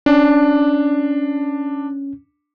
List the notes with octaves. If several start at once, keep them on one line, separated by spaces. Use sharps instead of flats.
C#4 D4